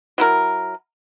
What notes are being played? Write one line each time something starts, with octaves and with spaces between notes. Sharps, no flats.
F#3 E4 A#4